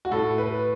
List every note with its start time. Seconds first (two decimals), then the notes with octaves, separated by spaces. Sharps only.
0.05 F#4
0.11 A2 A4
0.38 B4